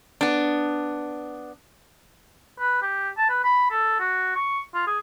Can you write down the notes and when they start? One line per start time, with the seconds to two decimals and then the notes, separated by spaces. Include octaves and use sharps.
0.21 B3 D4
2.60 B4
2.82 G4
3.17 A5
3.29 B4
3.44 B5
3.71 A4
3.99 F#4
4.35 C#6
4.73 F4
4.87 G#4